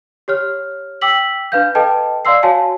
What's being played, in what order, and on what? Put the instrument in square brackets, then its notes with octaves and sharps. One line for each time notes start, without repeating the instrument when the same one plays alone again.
[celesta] G4 C#5 F6
G5 D6 E6 B6 F#7
D4 B4 F5 G6
A4 B4 D#5 G5 A5
D5 F5 C6 E6 C7
F#4 C#5 F5 G#5 A5